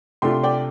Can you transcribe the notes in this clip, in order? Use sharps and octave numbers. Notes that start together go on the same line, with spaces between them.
C3 A3 D4 F4 G5 C6
D5 G5